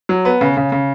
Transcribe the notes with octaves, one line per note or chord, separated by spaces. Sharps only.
F#3
B3
C#3
C#3
C#3